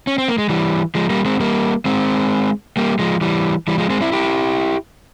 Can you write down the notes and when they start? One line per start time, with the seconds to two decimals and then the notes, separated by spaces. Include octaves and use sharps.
0.07 C#4
0.18 C4
0.28 A#3
0.38 G#3
0.49 E3 G3
0.95 F3 G#3
1.10 G3 A#3
1.25 G#3 C4
1.40 G3 A#3
1.85 G#3 C4
2.77 G3 A#3
2.99 F3 G#3
3.21 E3 G3
3.68 E3 G3
3.78 F3 G#3
3.90 G#3 C4
4.01 C4 E4
4.12 E4 G4